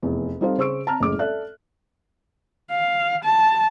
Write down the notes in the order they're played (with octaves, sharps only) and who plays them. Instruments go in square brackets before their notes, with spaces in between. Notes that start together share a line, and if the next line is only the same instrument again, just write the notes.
[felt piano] F1 E2
G3 C4 D#4 A4 C5 F5
C#3 C5 C#6 E6 D7
A5 A#5 F6
F#1 A2 G#3 D6
A4 D5 E5 F#6
[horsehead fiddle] F5
A5